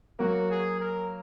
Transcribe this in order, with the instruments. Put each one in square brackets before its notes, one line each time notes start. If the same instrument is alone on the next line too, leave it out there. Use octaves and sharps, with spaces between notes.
[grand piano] F#3 A#3 [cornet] F#4
[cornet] G#4
A#4